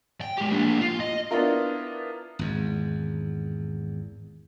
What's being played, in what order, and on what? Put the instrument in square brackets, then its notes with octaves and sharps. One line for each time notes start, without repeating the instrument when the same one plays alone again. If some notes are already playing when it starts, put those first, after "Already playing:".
[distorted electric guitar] G5
G#3 G4
A#3 D4
F4
D#5
[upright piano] B3 D4 E4 F4 A#4
[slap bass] G#1 E2